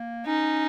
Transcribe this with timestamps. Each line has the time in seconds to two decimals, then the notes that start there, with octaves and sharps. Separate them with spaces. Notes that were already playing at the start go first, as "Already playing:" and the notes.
Already playing: A#3
0.26 C#4 D#4